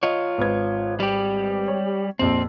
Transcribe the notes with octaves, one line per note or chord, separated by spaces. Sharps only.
F4 C#5 D#5
G#1 B4 G#6
G3 G4
C#5
A#1 F2 A#2 C4